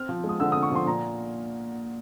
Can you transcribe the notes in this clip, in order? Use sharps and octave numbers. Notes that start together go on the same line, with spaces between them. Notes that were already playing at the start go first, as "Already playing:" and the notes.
Already playing: C4 F6
F3
G#3
D#6
D3 E6
C4 D#6
C#6
F3 C6
A#2 A#5